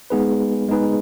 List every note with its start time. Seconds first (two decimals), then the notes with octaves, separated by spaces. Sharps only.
0.10 G#3 B3 D#4 G#4 B4
0.69 G#3 B3 D#4 G#4 B4